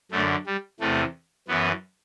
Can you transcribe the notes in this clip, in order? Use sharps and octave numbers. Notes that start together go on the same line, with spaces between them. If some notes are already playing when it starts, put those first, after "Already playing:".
F#2 D3 A3
G3
E2 C3 E3 A3
F#2 E3 B3